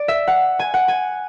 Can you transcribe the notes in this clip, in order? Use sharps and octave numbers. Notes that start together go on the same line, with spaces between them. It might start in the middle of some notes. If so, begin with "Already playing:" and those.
Already playing: D5
E5
F#5
G#5
F#5
G#5